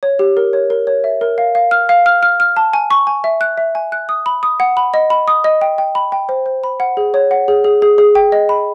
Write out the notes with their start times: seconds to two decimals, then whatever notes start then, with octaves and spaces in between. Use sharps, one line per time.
0.03 C#5
0.19 G4
0.37 A#4
0.53 C#5
0.70 A#4
0.87 C#5
1.04 E5
1.21 A#4
1.38 F5
1.55 F5
1.71 F6
1.89 F5
2.06 F6
2.23 F6
2.40 F6
2.56 A5
2.73 G#5
2.91 C#6
3.07 G#5
3.24 E5
3.41 F#6
3.58 E5
3.75 G#5
3.92 F#6
4.09 D#6
4.26 B5
4.43 D#6
4.60 F#5
4.77 B5
4.94 D#5
5.10 B5
5.28 D#6
5.44 D#5
5.61 G5
5.78 G5
5.95 B5
6.12 G5
6.29 C5
6.46 C5
6.64 B5
6.80 F#5
6.97 G#4
7.14 C#5
7.31 F#5
7.48 G#4
7.64 G#4
7.82 G#4
7.98 G#4
8.15 G5
8.32 D#5
8.49 B5